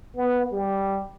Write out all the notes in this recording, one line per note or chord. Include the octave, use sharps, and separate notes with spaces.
B3
G3